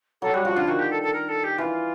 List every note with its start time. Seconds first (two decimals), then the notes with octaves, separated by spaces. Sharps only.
0.22 F#3 A4
0.34 G3 F#4
0.45 F3 F#4
0.56 D3 F4
0.68 D#3 F#4
0.79 G4
0.90 A4
1.02 A4
1.13 A#4
1.29 A4
1.44 G4
1.58 E3 F4